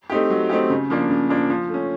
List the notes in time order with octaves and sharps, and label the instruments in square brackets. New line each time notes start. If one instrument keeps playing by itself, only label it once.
[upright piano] A3 C4 D#4 G4
F#3
A3 C4 D#4 G4
C#3
F3 A#3 D4
C#3
F3 A#3 D4
F3
A3 C#4